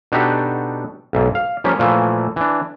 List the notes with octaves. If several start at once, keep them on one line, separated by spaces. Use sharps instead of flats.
B2 D4 D#4 F#4 G4 A4
B1 G#2
F5
F3 G3 A#3 C#4 G4
A#2 E3 F3 A3
E3 D4